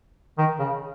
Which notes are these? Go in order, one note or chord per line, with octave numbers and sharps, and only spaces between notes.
D#3
C#3